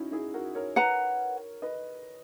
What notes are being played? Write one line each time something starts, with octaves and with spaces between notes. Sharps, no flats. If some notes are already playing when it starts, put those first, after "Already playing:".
Already playing: C#4 D#4 E4 F#4
E4 G#4
F#4 A#4
A#4 C#5
B4 F#5 A#5
B4 D#5